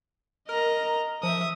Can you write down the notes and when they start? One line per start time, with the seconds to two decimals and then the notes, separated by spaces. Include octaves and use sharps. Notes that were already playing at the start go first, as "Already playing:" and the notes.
0.49 A#4 D#5 A#5
1.23 F3 E5 D#6